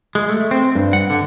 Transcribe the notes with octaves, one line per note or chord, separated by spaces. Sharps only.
G#3
A3
C4
G2
F#5
D3